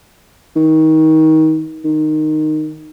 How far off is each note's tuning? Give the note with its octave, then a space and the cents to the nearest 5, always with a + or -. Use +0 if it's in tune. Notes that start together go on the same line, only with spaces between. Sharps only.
D#3 +25
D#3 -15